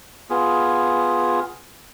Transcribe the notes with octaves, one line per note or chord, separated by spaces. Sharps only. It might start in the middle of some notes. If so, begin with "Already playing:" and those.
B3 F4 G#4